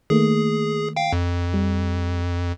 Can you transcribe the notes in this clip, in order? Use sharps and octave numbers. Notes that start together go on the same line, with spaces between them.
D#3 A3 A#3 G#4
F5 G5
F2
G3